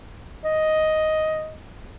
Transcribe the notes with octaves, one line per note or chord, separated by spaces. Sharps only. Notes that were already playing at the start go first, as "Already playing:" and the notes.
D#5